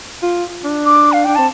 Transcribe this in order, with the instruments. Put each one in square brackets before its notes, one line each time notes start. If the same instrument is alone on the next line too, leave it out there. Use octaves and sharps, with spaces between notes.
[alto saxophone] F4
D4
[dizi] D6
F5
[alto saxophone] D4 [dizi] G5
[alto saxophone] C4 [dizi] A5